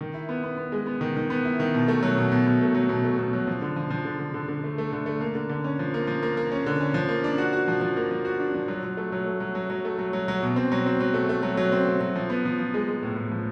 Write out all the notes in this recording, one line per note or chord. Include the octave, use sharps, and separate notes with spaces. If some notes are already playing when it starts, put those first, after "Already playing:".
D#3
E4
B3
B3
B3
G#3
B3
D#3
D#3
B3
E4
D#3
B2
A3
F#3
B2
B2
B2
A3
F#3
B2
A3
B2
F#3
F3
D3
F3
F3
D3
D3
D3
D3
A3
A3
D3
A3
A#3
D3
D3
C#4
F3
A#3
F3
A#3
A#3
C#4
D3
C#4
F3
A#3
D4
F#4
F#4
F3
F3
A#3
F3
F#4
D4
F3
F#3
F#3
A3
F#3
A3
F#3
F#3
F#3
A3
F#3
F#3
F#3
B2
C4
F#3
C4
F#3
A3
A3
F#3
F#3
C4
C4
F#3
F3
B3
F3
F3
G#3
G#3
A2
A2
F3